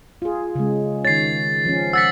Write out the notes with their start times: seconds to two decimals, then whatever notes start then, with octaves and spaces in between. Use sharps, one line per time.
0.22 F4 G#4
0.55 C#3 G#3
1.05 D#3 C#5 A6 C7
1.65 F3 C#4
1.93 F#5 E6 A6 B6